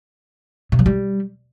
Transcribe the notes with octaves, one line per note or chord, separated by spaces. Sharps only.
C3
F#3
G3